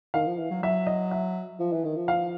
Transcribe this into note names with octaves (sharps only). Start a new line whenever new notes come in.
D#3 F5
F3
E3
F#3
F#3 E5
D#5
E5
F3
E3
D#3
F3
F5